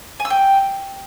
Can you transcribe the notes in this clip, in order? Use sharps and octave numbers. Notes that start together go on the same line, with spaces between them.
G#5
E6
G5